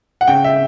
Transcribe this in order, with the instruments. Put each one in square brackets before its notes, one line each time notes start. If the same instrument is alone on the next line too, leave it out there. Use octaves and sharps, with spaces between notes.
[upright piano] F#5
C#3 G5
E5